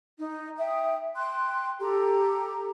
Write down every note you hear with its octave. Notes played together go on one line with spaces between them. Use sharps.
D#4
E5 G5 D#6
G5 C6 F#6
G4 A4 A#5